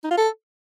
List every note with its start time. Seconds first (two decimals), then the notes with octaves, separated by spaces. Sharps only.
0.04 D#4
0.11 F4
0.17 A4